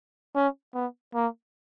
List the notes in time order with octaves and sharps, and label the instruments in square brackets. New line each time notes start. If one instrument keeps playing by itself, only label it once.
[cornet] C#4
B3
A#3